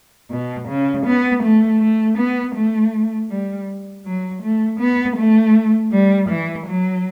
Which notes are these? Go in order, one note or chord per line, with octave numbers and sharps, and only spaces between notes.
B2
C#3
B3
A3
A3
B3
A3
G3
F#3
A3
B3
A3
G3
E3
F#3